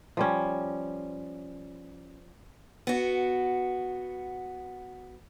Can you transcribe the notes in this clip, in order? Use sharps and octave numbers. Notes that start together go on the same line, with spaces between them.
F3 G3 C#4
B3 F#4